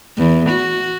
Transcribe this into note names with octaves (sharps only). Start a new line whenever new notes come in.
E2
F#4